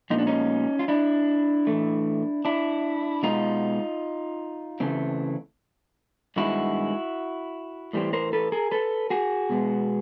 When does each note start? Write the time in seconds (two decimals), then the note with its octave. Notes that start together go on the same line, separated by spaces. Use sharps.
0.10 A#2 F3 G#3 B3 D#4
0.19 D4
0.27 C#4 D#4
0.79 F4
0.88 D4 E4
1.67 A2 E3 A3
2.45 D4 E4
3.23 B2 G#3 B3 D#4 F4
4.80 C#3 E3 A3 C4
6.36 G2 D#3 G#3 B3 E4 F#4
7.93 A2 E3 G3 C4
8.13 A#4 C5
8.33 A4 B4
8.52 G#4 A#4
8.71 A4 B4
9.10 F#4 G#4
9.50 B2 G#3 B3